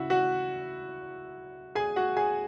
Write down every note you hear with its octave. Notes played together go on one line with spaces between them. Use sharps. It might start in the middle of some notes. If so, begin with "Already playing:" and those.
Already playing: C#3 E4 F#4 E5 F#5
F#4 F#5
G#4 G#5
F#4 F#5
G#4 G#5